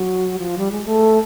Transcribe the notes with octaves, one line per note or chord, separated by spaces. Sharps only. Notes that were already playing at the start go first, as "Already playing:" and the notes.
Already playing: F#3
F3
G3
G#3
A3